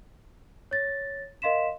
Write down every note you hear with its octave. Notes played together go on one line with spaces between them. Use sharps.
C#5 A6 A#6
A#4 D#5 F5 C6 B6 E7